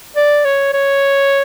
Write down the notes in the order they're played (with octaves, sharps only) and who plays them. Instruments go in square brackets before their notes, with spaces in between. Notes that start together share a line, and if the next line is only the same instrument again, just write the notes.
[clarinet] D5
C#5
C#5